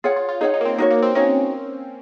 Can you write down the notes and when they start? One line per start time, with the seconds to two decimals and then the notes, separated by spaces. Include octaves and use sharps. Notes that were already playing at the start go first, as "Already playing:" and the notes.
0.04 F4 G#4 C#5 F#5
0.16 F4
0.29 F4
0.41 D#4 G#4 C#5 F#5
0.54 D#4
0.61 A#3
0.65 C4
0.78 A#3 D#4 F#4 C#5
0.90 A#3
1.02 C4
1.15 C#4 D#4 F#4 C#5